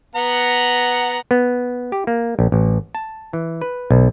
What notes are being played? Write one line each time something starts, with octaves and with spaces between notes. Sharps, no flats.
B3 F#5 A#5
B3
G4
A#3
A#1
A1
A5
E3
B4
B1